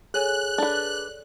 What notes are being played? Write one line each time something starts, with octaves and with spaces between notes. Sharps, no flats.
G#4 A4 C#5 G#5 F#6
D4 A4 B4 D5